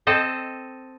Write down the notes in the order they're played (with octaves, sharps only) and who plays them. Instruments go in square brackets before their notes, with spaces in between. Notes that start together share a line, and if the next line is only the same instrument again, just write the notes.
[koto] C4 A4 D#5